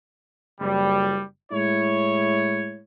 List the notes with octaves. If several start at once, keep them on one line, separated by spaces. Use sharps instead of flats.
F#1 G3
A2 G#3 E4 C#5